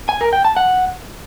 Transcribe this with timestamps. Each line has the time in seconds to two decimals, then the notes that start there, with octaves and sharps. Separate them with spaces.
0.09 G#5
0.21 A#4
0.33 G5
0.45 A5
0.56 F#5